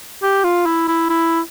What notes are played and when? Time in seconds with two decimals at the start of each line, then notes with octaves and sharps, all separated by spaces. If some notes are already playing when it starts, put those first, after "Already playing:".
0.23 G4
0.44 F4
0.66 E4
0.88 E4
1.10 E4